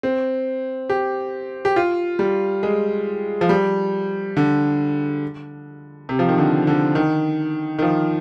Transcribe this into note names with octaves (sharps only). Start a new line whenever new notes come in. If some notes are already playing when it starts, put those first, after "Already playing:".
C4
G4
G4
F4
G3
G#3
F3
G3
D3
C3
F3
D#3
D3
D3
D#3
D#3
F3